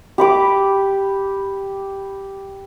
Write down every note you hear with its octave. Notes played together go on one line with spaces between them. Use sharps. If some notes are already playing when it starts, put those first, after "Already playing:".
G4 B5 D6